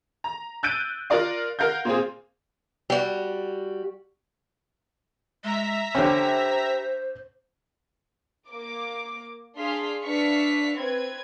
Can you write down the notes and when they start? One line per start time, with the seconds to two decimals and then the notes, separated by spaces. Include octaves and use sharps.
0.24 A#5
0.63 E6 F#6 G6 A6 D7 D#7
1.10 F4 A#4 D5 F5
1.59 A#4 F5 F#5 G6
1.85 A#2 A#3 C4 G#4
2.90 G3 F#4
5.44 G#3 E5 A#5 B6
5.95 D3 C#4 G4 B4 C5
8.50 A#3 D6
9.57 D4 G#4 F5 C6 B6
10.04 D4 B4 E5 F5 C#6 B6
10.76 C4 B4 G#6